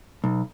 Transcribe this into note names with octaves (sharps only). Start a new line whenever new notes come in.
B1